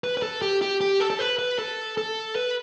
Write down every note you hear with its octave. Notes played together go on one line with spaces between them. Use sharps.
B4
B4
A4
G4
G4
G4
A4
A4
B4
B4
A4
A4
B4